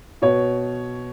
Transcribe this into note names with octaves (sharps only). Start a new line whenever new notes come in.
B2 C#5